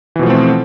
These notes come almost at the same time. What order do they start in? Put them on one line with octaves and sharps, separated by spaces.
E3 B2 F3 A3 C4